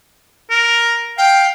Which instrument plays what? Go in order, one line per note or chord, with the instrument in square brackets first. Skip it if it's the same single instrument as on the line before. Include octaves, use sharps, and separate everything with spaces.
[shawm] A#4
[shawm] F5 [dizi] G5